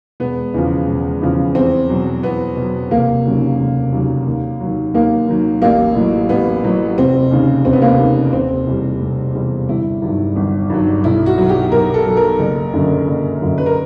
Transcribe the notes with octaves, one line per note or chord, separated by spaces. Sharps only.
E1 B3
E2 C#3 F3
E1
E2 C#3 F3
E2 C4
B2 F#3
E2 B3
B2
F#3
F1 A#3
D#2 C#3 F#3
F1
D#2 C#3 F#3
D#2
D#3 F#3
D#2 A#3
D#3 F#3
A1 A#3
A2 F#3
A1 B3
A2 F#3
F1 C4
D#2 C#3
F1 C4
B3
A#3
B3
D#2 C#3
F1 C4
E2 B2 G3
F1
E2 B2 G3
G1 E4
G2 D#3 F#3
G1
G2 D#3 F#3
B1 E4
F#4
B2 F#3
G4
B1 A#4
A4
B2 F#3
A#4
F#1
F#2 D3 F#3
F#1
F#2 D3 F#3
B4
A#4